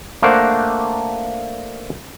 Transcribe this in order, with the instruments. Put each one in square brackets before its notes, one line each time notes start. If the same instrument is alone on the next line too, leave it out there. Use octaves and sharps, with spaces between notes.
[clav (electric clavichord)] A3 A#3 D4 A#4 C5 F#5